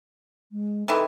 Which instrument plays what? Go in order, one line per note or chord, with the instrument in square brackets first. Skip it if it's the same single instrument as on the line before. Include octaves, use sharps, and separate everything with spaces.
[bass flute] G#3
[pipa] C3 D#3 E3 [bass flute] A4